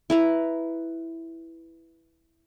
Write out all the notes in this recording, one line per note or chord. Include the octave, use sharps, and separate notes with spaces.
E4 B4 A#5